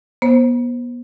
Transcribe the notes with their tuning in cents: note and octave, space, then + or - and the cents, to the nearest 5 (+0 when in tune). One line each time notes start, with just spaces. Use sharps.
B3 -30 C5 +10